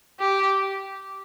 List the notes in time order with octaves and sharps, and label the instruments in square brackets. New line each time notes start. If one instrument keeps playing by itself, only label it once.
[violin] G4